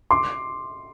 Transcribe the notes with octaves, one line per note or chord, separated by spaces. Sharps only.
C6 D6